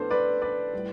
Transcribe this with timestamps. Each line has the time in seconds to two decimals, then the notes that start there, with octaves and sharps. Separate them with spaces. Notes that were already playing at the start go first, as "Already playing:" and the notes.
Already playing: A2 F3 B3 D4 A4 C5
0.10 B4 D5
0.42 B4 D5
0.73 A2 G3